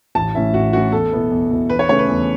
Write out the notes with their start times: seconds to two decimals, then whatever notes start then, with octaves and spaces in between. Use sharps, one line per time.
0.15 A1 A5
0.34 A2 E3 C#4 E4 E5
0.53 A1 F#4
0.73 A2 E3 C#4 E4 F#4
0.92 E2 A4
1.12 B2 B3 E4
1.31 E2
1.51 B2 B3 E4
1.70 E2 B4
1.79 C#5
1.89 C#3 A3 C#4 E4 C#5
1.99 B4
2.08 E2